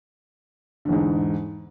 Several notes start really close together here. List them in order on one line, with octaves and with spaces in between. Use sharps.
D3 E2 G#2